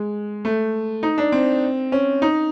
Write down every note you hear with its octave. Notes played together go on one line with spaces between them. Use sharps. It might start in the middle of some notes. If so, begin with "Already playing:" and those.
Already playing: G#3
A3
D#4
D4
C4
C#4
D#4